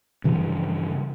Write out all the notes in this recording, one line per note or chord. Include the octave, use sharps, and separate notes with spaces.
G2 C#3 E3 F3